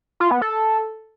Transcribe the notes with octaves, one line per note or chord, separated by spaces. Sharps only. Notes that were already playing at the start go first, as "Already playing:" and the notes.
F4
B3
A4